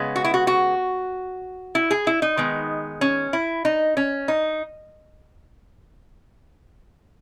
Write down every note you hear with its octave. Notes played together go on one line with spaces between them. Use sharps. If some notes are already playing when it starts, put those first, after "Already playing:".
Already playing: C#3 G#3 B3
F#4
E4
F#4
F#4
E4
G#4
E4
D#4
D#3 G#3 B3
C#4
E4
D#4
C#4
D#4